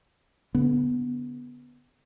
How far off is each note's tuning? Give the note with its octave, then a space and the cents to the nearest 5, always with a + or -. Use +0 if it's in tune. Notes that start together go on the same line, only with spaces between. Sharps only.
D3 -45 B3 +0